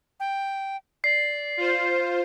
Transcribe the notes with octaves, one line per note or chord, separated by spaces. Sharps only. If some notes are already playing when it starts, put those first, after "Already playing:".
G5
D5 C7
F4 C5